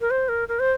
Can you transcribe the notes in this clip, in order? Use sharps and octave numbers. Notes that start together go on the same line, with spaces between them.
A#4
C5
A#4
A#4
C5